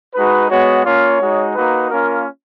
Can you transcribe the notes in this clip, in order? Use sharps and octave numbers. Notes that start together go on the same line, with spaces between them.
G#3 D#4 F#4 B4
G#3 B3 F#4 C#5
A#3 C#4 F4 C#5
G#3 D#4 F#4
A#3 D#4 F#4 B4
A#3 C#4 F4 A#4